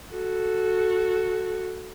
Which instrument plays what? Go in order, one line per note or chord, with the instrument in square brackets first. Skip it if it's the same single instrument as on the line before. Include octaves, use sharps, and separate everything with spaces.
[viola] F#4 A4